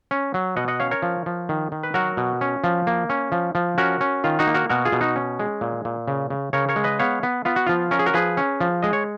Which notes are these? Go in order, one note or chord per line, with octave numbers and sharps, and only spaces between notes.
C#4
F#3
B2 D#5 F#5
D#5 F#5
C#4 C#5 F5
A#4 C#5
F3
F3
D#3
D#3
B4
F#3 F#4 A#4
B2
C#4
F3
A#3
C#4
F3
F3
C#4 F#4 A#4
C#4
D#3 F4
D#4 F#4
A#3
F#4 A#4
B2 F#4 A#4
F4 G#4
B2
D#4 F#4
C#4
G#3
A#2
A#2
C#3
C#3
C#3 A#4 C#5
A#4 C#5
G#3
B4 D#5
B3 C#5 F5
B3
B3 F4
F#4
F3 F4
C#4 A#4
G#4
F#4 A#4
F3 G#4 B4
C#4
F3
G#3 D#5
C#5